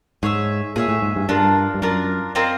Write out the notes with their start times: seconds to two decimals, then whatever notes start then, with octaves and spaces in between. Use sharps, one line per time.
0.23 G#2 G#4 C#5 E5
0.76 A#2 G#4 C#5 E5
0.89 A2
1.02 G#2
1.16 G2
1.29 G2 D4 F4 A#4
1.74 G2
1.82 F#2 D4 F4 A#4
2.35 C4 F4 A#4 D#5